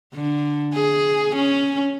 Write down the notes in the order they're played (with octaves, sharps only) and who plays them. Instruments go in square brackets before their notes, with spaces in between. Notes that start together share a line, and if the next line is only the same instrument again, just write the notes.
[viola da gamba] D3
G#4
C#4